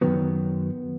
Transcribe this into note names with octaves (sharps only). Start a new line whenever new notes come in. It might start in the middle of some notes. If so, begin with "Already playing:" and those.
F#2 D#3 F#3 B3